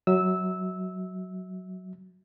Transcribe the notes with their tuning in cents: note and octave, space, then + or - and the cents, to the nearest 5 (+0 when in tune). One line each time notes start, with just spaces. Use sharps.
F#3 +0 E5 -30 E6 -15